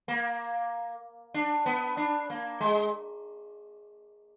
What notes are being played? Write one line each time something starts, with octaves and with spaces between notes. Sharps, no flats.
A#3
D4
B3
D4
A#3
G#3